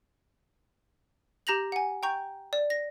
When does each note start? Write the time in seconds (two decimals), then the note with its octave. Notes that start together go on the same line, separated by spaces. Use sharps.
1.47 G4 A#5 G6 A#6 F7 F#7
1.72 F#5 G#5
2.03 G5 A#5 C#6 G6
2.53 D5
2.70 A#6